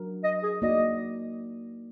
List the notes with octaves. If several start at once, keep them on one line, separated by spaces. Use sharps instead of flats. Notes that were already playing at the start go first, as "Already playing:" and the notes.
Already playing: F#3 D4 F#4 A#4
D#5
G#4
A#3 D#4 F#4 D5 D#5